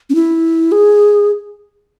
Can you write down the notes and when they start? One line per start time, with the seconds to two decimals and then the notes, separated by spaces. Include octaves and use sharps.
0.10 C#4
0.15 E4
0.72 G#4